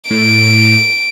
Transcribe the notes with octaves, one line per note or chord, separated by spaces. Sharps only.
A2 D7